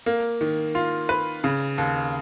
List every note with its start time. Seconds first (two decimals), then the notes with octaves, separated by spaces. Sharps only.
0.06 A#3
0.41 D#3
0.75 F4
1.09 B4
1.44 C#3
1.78 D#2